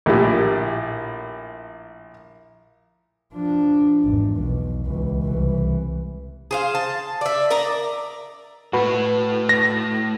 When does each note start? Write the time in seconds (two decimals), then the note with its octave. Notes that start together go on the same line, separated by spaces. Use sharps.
0.06 A#1 A2 G4
3.33 F3 D4
4.04 G#1 E2
4.37 B1
4.85 C#2 E3
5.23 C2 E3
6.51 G#4 C5 F5
6.75 A5
7.21 D5 E5
7.50 A#4 D5 D#5 A#5
8.73 A2 A3 F#4 B4
9.49 A#6